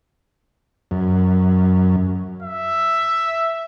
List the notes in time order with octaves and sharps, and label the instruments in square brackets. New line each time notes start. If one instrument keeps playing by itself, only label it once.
[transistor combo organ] F#2
[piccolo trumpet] E5